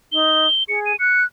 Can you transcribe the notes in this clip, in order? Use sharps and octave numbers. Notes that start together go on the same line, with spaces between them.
D#4 G7
G#4 C#7
D#7
F#6 C#7